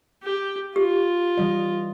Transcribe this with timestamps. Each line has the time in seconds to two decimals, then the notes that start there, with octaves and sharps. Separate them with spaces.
0.23 G4
0.76 F4 G4
1.38 E3 G3 D#5